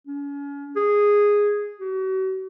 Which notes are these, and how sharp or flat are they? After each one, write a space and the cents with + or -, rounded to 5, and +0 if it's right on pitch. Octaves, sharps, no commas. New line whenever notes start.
C#4 +35
G#4 -5
F#4 +40